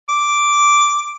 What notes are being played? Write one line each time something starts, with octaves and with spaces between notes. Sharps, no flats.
D6